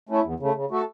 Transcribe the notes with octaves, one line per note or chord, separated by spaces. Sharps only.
A3 C#4 E4
E2
C#3 A3
C#3
A3 F#4 A4